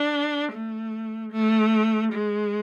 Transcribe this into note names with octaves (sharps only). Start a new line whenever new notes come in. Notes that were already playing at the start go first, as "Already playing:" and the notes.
Already playing: D4
A3
A3
G#3